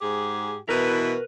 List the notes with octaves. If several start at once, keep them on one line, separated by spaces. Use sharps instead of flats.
G#2 G4 G#4
B2 E3 E4 A#4 B4